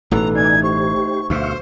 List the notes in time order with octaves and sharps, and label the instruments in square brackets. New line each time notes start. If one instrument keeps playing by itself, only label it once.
[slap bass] A1 B2 E3 [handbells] D#4 A4 B4 [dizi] A#5
[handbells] A3 D#4 [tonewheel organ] D5 G#5 [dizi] G#6
[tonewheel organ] G4 C5 [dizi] C#6
[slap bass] D2 B2 [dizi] C5 [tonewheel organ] E5 F5 C#6